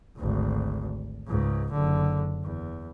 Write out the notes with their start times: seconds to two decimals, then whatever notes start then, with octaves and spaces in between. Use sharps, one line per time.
0.17 G#1 D2
1.27 C#2 G#2
1.72 F#1 D3
2.44 E2